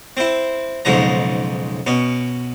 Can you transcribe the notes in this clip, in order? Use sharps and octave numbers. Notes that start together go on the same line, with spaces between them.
C4 E4
B1 F2 G#2 C#3 C#4 A#5
B2 C#4